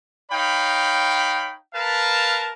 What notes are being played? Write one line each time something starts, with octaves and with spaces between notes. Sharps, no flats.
D#4 C#5 F5 G5 B5
A#4 B4 F5 A5